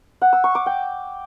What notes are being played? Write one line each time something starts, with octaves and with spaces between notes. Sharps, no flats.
F#5
E6
C#6
D6
G5